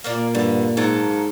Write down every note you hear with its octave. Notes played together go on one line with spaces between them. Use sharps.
A#2 A#3 A#4 D5
G2 D3
G#2 F#3 A#3 A4